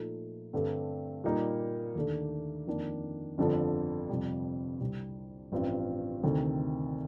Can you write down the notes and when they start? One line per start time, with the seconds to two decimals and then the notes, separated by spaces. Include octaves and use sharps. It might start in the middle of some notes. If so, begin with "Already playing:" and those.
Already playing: A#2 F3 A3 D#4 A4
0.53 G2 D3 A3 C4 G4
1.24 A#2 G3 A#3 D#4 A#4
1.96 D#2 D3 A3 D4
2.67 F2 D#3 A#3 D4
3.38 G1 F2 D3 F3
4.09 F2 C3 G3
4.81 C2 C3 G3
5.52 A1 G2 F3 C4 F4
6.23 D2 C3 D#3 A3 C4